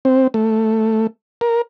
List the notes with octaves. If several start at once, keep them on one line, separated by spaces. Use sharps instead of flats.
C4
A3
A#4